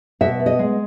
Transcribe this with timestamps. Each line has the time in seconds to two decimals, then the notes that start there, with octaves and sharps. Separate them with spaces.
0.21 B2 E5
0.40 B3
0.46 D#5
0.59 G#3